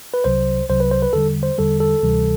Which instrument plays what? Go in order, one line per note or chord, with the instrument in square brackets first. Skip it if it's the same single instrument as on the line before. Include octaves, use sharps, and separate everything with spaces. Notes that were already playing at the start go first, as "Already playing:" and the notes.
[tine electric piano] B4
C2 C3 F#3 C5
C2 C3 F#3 C5
B4
C5
B4
E2 D3 G3 A4
C5
E2 D3 G3 A4
A4
D2 C3 E3 G3